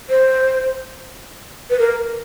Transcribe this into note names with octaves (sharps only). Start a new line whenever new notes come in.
C5
B4
A#4